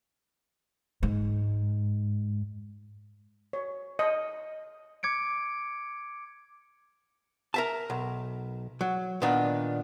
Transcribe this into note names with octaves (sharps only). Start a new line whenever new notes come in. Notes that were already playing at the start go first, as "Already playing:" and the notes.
G#2
C#5
D#5
D6 G#6 C#7 D7
A#4 E5 A5
B1
F#3
A#2 D#3 B3 D4